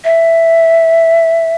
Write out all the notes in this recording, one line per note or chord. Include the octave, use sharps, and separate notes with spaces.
E5